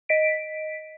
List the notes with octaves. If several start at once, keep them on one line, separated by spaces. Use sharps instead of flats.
D#5 B6 D7